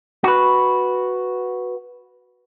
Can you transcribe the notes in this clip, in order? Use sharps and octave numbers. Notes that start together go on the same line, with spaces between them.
F#4 B4